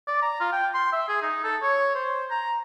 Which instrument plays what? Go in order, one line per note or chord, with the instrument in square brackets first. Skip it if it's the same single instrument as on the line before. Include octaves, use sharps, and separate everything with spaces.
[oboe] D5
A#5
F4
G5
C6
E5
G#4
D#4
A4
C#5
C5
A#5